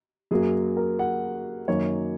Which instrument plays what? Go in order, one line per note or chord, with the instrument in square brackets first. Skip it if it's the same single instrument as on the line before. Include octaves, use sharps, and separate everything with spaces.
[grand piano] F#2 F#3 A#3 G#4
A#4
F#5
F#2 D#3 A#3 C#5